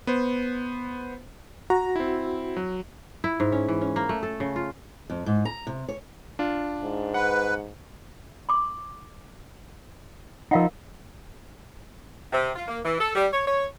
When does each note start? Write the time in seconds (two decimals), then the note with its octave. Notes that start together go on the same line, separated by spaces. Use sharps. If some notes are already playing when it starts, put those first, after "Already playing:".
0.07 B3 C5
1.70 F#4 A#5
1.96 C4 E4
2.57 F#3
3.24 E4
3.40 G#2
3.52 C#4
3.68 E3
3.81 C#4
3.96 A#3
4.09 A3
4.23 A4
4.40 C#3
4.56 F4
5.10 F2
5.26 G#2
5.45 A#5
5.67 C3
5.89 C#5
6.39 D4 F4
6.83 G#2
7.14 B4 F#5
8.49 C6 D6
10.51 F3 D#4 A#4 F5 F#5
12.33 C3
12.56 F4
12.68 A#3
12.84 E3
13.00 A4
13.15 G3
13.32 C#5
13.47 C#5